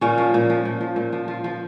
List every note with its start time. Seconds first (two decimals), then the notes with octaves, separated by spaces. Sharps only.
0.01 A#2 C#4
0.18 F3
0.34 A#2
0.50 F3
0.65 A#2
0.81 F3
0.96 A#2
1.12 F3
1.28 F3 F4
1.44 F3